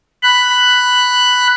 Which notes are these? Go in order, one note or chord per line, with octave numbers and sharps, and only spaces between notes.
B5 F#6